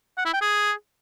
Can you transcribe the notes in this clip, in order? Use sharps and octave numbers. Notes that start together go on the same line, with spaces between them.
F#5
E4
G5
G#4